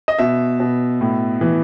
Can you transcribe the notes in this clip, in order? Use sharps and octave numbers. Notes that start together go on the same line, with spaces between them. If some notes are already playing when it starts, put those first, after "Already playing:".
D#5
B2 E5
B2
A2
E3